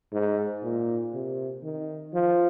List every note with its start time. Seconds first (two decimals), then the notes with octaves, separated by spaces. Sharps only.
0.13 G#2
0.64 A#2
1.14 C3
1.63 D#3
2.14 F3